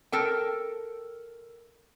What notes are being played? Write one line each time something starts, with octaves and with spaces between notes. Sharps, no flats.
A4 A#4 G5